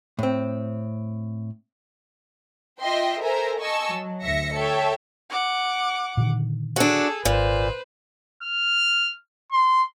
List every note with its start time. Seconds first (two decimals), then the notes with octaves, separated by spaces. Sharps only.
0.19 A2 C4
2.81 F4 D#5 E5 G5 C6
3.21 A4 A#4 C5 E5 G#5 A#5
3.59 D#5 G#5 A5 C#6 E6
3.89 F#3
4.23 D2 E5 A#6 C#7
4.55 A4 C#5 E5 G5
5.30 F#5 D6
6.17 A#2 D3 D#3
6.76 D4 F#4 G#4 A4
7.25 G#1 A#2 B4 C5
8.43 F6
9.52 C6